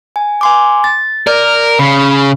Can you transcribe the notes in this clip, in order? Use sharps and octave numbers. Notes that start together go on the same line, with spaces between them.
G#5
G#5 C6 D6
A6
A#4 D5
C#3 B5